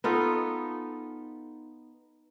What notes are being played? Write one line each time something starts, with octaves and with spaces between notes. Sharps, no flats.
B3 D#4 F4 A4